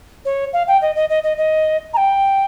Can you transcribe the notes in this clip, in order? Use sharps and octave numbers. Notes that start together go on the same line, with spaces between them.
C#5
F5
G5
D#5
D#5
D#5
D#5
D#5
A#5
G5